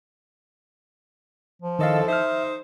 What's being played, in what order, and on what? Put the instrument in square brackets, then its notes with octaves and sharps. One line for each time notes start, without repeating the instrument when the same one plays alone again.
[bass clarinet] F3
[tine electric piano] D#3 D#5 F5 [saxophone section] C#4 E4 A4
[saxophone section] D#4 C5 [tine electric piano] E5 F6